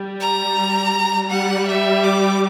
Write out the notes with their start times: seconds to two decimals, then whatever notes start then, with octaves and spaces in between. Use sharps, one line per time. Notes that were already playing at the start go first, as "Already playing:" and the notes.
Already playing: G3
0.20 A#5
1.30 G3 F#5
1.68 E5
2.04 D6